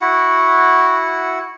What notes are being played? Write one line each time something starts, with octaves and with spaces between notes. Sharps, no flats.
E4 F#4 F#5